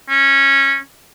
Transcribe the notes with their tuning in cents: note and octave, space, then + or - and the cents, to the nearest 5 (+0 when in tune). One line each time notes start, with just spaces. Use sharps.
C#4 -15